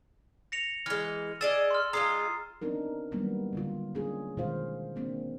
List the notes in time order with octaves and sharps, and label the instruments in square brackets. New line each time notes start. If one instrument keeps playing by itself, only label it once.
[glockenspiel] A#6 C#7 F7
[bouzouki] E3 G#3 [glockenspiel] F6
[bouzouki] G#4 D5 D#5 [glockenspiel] E6 A6 E7
[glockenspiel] C6 F6
[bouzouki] G#3 D#4 F4 [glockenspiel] A#5 D#6 C7
[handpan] B3 C4 D4 D#4 A#4
D#3 F#3 G3 A#3 B3
D3 G3 F4
A#3 C#4 D4 F4 G#4
B2 D#3 G#3 F4 C5 F5
A#3 C4 D4